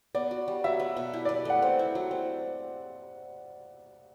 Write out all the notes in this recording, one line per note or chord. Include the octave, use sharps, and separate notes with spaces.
B3 D5
F#4
G3
F#3 E5
B3
B2
E4
D5
B4
A3 F#5
C4
E4
F#3
C4